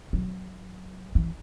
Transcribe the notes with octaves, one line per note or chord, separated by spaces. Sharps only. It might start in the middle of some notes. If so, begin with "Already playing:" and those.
F#3
E3